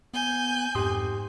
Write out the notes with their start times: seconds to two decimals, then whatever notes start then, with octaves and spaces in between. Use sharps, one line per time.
0.14 B3 G#5 G6
0.75 F2 G#2 G4 C6 D#6